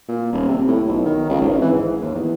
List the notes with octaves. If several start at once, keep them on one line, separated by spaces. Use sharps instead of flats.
A#2
D#1
C3
A2
B1
D#3
C#2
G#1
E3
G#2
D#2
E2